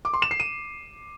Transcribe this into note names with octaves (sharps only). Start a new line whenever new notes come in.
D6
C6
E7
C7
D#7